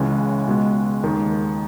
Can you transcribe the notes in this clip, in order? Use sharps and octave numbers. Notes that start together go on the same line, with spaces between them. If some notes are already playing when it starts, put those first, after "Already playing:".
Already playing: C#2 C#3 E3 G#3
C#2 B2 G#3
D#2 D#3 G#3